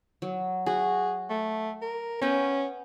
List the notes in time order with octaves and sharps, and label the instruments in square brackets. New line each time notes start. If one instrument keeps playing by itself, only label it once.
[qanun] F#3
[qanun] F#4 [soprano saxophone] G#4
[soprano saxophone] A3
A#4
[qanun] B3 G5 [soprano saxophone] C#4